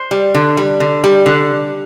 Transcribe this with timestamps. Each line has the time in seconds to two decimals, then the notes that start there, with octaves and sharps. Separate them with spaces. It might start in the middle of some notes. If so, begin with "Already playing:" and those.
Already playing: C5
0.11 G3
0.34 D3
0.57 G3
0.80 D3
1.04 G3
1.26 D3